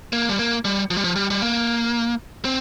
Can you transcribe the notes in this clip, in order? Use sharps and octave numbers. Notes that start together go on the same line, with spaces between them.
A#3
G3
A#3
G3
F3
G3
F3
G3
G3
A#3
C4